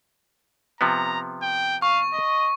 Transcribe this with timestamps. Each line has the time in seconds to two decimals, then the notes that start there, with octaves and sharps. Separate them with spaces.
0.81 C3 F3 B3 A#5
1.42 G5
1.82 F5 C#6
2.13 D#5